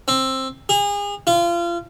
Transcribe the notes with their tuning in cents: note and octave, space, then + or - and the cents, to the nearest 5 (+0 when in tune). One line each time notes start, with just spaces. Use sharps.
C4 +15
G#4 -35
F4 -30